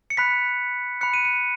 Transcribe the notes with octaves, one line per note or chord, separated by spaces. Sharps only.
C#7
B5 F#6 B6
B5 F#6 C#7
D#7
C#7